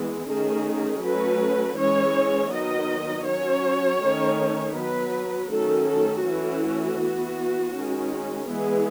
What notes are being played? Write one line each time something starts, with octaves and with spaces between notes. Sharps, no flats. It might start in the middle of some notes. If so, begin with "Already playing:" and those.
Already playing: E3 G#3 B3
D#3 A3 C#4 G#4
F#3 A3 C#4 B4
E3 G#3 C#4 C#5
D#3 F#3 B3 D#5
F#3 C#4 C#5
D#3 A3 C#4
F#3 B3 B4
D#3 F#3 A3 C#4 A4
A4
E3 A3 C#4 F#4
E3 B3
D#3 G#3 C#4
E3 G#3 B3 G#4